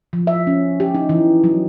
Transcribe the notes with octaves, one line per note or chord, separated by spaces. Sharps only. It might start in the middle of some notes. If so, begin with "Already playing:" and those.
F3
E5
C#4
G4
D#4
E3
F#3